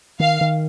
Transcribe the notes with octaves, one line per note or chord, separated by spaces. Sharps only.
D#3 F5
D#3